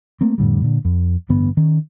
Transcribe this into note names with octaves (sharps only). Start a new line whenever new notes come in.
A3 A#3 C4
F2 A2 D3 G3
A#2 D3
F2
A1 G2 D3 B3
D#3 C#4